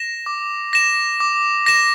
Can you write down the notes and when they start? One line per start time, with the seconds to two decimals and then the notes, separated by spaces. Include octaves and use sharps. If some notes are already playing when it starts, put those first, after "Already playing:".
Already playing: A#6 E7
0.26 D6
0.73 A#6 E7
1.20 D6
1.66 A#6 E7